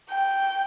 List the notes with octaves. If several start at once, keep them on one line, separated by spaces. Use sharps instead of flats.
G5